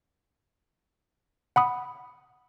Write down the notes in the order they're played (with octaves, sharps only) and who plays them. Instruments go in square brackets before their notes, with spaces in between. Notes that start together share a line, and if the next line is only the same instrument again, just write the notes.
[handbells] F#5 B5 D#6